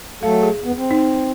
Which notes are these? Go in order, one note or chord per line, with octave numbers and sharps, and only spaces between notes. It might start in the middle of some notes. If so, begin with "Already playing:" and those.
F#3 A3 A4 F5
G#4
E2 B3
C4
D#4